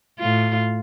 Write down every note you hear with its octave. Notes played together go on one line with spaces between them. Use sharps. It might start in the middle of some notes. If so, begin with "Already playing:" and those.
A2 F4